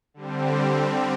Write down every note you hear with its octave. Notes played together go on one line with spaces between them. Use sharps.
D3 G3 C4